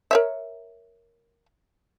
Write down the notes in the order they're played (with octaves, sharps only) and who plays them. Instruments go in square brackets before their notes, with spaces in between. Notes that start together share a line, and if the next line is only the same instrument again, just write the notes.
[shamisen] A#4 C#5 E5